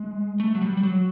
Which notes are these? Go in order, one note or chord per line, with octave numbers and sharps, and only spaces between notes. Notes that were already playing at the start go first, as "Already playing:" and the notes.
Already playing: G#3
A3
F#3
G3
G3
F#3